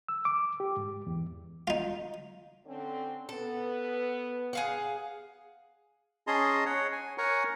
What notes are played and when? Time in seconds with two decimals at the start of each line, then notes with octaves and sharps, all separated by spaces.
0.09 E6
0.25 D6
0.60 G4
0.77 G#2
1.07 E2
1.67 D#4 F4
2.66 D3 C4 C#4
3.29 B3 A4
4.53 G#4 F5 F#5
6.27 C#4 G#4 D#5 A5 A#5 C6
6.66 C#5 F#5
6.92 G#5
7.18 A#4 C#5 F#5 G#5 A#5 C#6